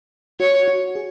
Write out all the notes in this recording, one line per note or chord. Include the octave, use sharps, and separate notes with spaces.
F#4 C#5
F#4
G#4